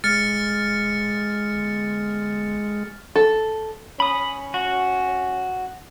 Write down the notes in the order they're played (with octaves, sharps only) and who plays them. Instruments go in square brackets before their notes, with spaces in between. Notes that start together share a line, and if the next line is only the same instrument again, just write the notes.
[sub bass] D#1 [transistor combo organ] G#3 [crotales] F6 A6 C#7
[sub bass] G1
[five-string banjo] A4
[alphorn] C#4 [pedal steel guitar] B5 D#6
[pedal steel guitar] F#4